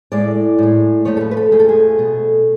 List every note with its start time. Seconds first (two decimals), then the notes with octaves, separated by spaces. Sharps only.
0.12 A2 G#3 D5
0.58 A2 G#3
1.05 F2 F3 A3 C#5
1.17 A4
1.21 B4
1.31 B4
1.37 A4
1.52 F2 F3 A3 G#4
1.59 A4
1.69 G#4
1.98 B2 A3